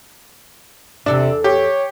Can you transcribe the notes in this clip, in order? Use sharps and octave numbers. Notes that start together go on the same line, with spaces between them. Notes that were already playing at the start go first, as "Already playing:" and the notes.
E2 C3 D4 A4 E5
G4 C#5